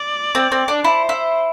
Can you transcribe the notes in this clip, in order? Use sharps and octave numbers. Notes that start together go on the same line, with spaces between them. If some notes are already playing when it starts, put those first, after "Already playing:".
Already playing: D5
C4
C4
D4
E4 C5
E4